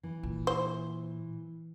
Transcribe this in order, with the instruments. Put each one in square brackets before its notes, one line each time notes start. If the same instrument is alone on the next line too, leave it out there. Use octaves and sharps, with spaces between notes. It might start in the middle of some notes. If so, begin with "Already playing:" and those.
[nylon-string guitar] E3
[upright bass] A#2
[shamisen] C5